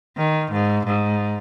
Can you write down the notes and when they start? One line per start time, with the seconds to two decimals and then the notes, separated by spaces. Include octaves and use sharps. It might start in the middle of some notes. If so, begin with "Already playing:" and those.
0.18 D#3
0.52 G#2
0.87 G#2